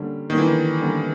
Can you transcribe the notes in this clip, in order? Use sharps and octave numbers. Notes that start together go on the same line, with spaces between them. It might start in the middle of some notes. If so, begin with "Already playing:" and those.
Already playing: D3 G3 A#3 C#4
D3 D#3 G3 A#3 C#4
E3
D#3
D3 G3 A#3 C#4